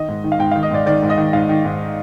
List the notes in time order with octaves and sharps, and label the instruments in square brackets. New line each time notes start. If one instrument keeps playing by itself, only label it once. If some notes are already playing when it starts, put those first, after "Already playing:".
Already playing: [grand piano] D#3 D#5
G#2
D#3
F5
G#2 G5
F5
D#3
D#5
G#2 D5
D#3 D5
G#2
D#5
D#3
G#2 F5
D#3
G#2